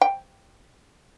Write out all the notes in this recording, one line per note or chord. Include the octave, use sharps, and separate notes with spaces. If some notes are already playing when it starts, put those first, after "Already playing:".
G5